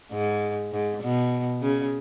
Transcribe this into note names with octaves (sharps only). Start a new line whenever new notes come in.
G#2
G#2
B2
C#3